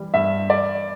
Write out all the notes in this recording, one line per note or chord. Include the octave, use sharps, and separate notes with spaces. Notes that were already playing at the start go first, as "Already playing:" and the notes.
Already playing: E3 G3
G2 E5
D5